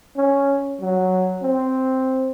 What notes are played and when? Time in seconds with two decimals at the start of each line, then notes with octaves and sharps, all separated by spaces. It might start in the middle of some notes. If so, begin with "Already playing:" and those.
0.17 C#4
0.80 F#3
1.42 C4